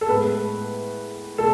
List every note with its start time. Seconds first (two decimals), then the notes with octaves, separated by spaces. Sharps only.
0.01 A4
0.09 A2 G#3 B3 B4
1.38 B2 A3 A4